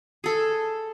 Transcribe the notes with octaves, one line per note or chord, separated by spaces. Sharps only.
G#4 A4